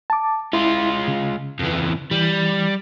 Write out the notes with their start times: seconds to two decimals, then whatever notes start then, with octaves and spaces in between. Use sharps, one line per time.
0.10 A5 D6
0.53 G#3 E4 F4
1.08 C#3
1.59 F2 E3
2.11 E3 G3